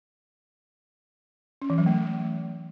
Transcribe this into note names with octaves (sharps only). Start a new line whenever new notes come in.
C#4
E3
F#3
A3